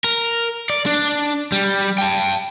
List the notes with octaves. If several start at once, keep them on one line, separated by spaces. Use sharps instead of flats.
A#4
D5
D4
G3
G5 A5